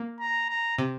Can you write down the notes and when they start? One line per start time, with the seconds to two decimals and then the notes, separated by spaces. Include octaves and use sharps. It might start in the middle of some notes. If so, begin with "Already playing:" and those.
Already playing: A#3
0.20 A#5
0.49 A#5
0.78 C3